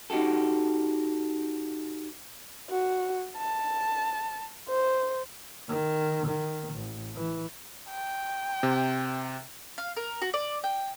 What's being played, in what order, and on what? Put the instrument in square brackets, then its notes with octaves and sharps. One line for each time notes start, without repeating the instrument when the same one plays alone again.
[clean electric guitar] C#4 D#4 F#4 G4 A4
[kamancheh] F#4
A5
C5
[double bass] D#3
D#3
A1
E3
[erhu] G5
[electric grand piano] C3
[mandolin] F5
A#4
F#4
D5
G5